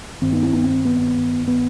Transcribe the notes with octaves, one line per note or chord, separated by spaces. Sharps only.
G2 D#3 C4
B3 D#4
C4 E4
B3 D#4
C4
B3
B3